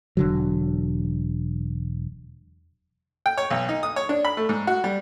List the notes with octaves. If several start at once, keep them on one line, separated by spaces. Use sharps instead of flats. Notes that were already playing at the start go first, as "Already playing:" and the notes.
E1 D3 F#3
G5
C#5
B1
D#4
D#6
C#5
D4
B5
A3
G#2
F#4
G3